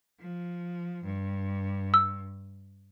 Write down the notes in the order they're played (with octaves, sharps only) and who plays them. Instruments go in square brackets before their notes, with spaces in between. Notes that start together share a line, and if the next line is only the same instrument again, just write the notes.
[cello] F3
G2
[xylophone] E6